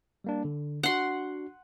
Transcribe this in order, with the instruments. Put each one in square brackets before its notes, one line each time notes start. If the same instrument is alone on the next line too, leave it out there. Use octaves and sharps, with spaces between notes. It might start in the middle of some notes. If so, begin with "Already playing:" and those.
[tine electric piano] G3 A#3 D4
D3
[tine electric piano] D4 F#4 [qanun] F#5 C6